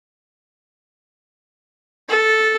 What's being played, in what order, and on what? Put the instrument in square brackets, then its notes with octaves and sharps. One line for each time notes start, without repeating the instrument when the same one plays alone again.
[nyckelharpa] A4